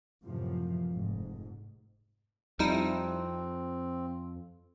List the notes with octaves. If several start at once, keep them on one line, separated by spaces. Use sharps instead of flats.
F#2 A2 C3 E3 F3
F1 G#2
F2 G3 C4 D#4 E4